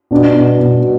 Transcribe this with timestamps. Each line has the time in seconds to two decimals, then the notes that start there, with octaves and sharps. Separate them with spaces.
0.11 B2 D4
0.35 B2
0.60 B2
0.83 B2